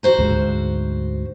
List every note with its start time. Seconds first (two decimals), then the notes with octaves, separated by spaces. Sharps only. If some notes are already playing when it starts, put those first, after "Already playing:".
0.03 F#4 C5 A#5
0.19 D2 G#2